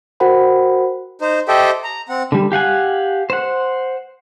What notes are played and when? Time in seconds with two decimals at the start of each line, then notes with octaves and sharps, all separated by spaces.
0.20 F#4 A#4 C5 F#5 G5 B5
1.21 D#4 C5
1.48 G4 A4 C5 D#5 E5 G5
1.84 A#5
2.09 C4 F#5
2.32 D3 G3
2.52 G4 F5 F#5 G#5
3.30 C5 F#5